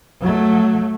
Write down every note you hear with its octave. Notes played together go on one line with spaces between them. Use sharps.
F#3 A3